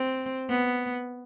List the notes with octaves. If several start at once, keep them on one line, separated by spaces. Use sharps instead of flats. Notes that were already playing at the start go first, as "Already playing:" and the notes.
Already playing: C4
B3